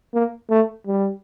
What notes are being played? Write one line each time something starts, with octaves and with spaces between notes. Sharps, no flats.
A#3
A3
G3